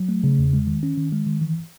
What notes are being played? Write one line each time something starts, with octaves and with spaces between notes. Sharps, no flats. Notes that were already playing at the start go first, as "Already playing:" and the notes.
Already playing: F#3
A3
C#3
E2
G#3
D#3
C#4
D#3
G#3
D#3
E3